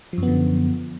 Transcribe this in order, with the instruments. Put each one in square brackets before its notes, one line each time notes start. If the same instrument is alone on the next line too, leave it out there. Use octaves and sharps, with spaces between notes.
[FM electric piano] F3
F#2
B3
D3